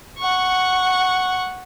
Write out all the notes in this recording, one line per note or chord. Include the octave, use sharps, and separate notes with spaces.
F#5 C#6